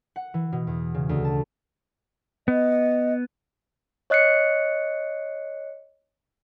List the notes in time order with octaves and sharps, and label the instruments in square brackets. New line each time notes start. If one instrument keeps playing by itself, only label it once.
[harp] F#5
E3
B2
E2
C#3
D2
A5
[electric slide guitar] B3 [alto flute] D#5
[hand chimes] C#5 D#5 F#6 C7 C#7